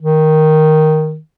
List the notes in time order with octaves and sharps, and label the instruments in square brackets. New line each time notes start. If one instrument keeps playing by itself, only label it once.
[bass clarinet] D#3